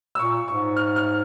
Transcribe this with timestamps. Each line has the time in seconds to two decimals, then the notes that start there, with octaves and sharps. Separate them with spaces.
0.15 E6
0.19 A#2 C#6
0.48 G#2 C#6
0.77 F6
0.96 F6